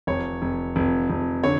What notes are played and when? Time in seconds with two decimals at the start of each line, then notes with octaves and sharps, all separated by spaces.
0.07 F1 C#5
0.42 F1
0.76 F1
1.10 F1
1.44 D3 C#5